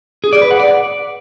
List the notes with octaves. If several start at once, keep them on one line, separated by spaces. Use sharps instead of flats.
G#4
D5
B4
F#5
D5